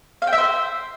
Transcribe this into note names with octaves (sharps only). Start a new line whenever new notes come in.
F5
G5
E5
C5